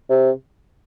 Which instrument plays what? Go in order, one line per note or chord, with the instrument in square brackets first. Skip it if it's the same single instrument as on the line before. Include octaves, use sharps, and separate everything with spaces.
[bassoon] C3